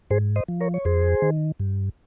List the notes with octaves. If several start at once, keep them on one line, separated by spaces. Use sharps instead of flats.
G#2 G#4 C5
C5 D#5
F3
A#4 C#5
C#5
F2 G#4 C5
D#3
G2